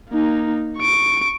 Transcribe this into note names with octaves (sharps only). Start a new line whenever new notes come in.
A#3 D#4
C#6 D7